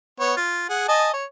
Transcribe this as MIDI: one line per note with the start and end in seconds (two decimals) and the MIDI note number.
0.20 0.34 59
0.20 0.34 73
0.37 0.66 65
0.69 0.84 68
0.69 0.84 78
0.88 1.10 75
0.88 1.10 80
0.88 1.10 81
1.13 1.25 73